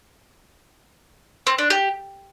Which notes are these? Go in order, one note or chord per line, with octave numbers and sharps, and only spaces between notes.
C4
D4
G4